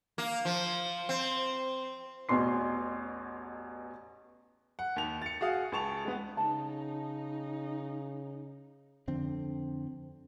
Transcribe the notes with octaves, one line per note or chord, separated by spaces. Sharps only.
A#3
F3
C4
A1 E2 B2 C6 C7
F#5
D#2 F7
A6 C#7
F#4 G#4 F5 D#6
C#2 G#4 A5 C#6 F7
G#3 B3
C#3 D#4 A5
F2 D3 C4